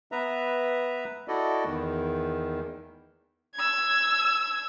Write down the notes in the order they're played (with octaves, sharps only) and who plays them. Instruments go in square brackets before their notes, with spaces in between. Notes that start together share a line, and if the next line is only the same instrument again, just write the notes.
[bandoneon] B3 B4 E5 A#5
E4 F#4 A4 D5 D#5
E2 D#3
[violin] E6 G#6